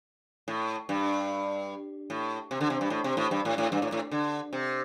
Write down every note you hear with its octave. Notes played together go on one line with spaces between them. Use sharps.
A2
G2
A2
C3
D3
C3
G2
A2
C3
A2
G2
A2
A2
G2
A2
A2
D3
C3